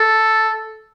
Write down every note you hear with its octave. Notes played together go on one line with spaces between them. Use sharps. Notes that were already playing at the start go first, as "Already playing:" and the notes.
Already playing: A4